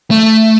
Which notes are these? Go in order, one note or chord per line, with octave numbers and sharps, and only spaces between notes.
A3